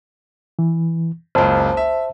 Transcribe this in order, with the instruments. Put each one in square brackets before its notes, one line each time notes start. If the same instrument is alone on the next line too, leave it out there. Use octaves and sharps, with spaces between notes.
[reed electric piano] E3
[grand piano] F#1 C#2 [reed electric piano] C5 A5
[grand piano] E5